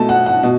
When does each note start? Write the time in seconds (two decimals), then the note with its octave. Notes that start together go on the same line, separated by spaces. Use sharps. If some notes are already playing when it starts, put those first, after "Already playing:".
Already playing: B2 A3 A5
0.09 F#5
0.26 F#5
0.43 B2